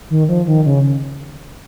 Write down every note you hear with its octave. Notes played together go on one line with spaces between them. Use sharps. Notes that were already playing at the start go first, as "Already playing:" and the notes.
D#3
F3
D#3
C#3